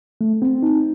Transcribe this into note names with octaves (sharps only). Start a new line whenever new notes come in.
A3
C4
D#4